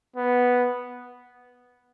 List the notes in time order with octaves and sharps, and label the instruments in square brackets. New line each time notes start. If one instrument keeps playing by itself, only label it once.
[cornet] B3